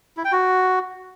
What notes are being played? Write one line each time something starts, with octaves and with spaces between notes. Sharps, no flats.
E4
G5
F#4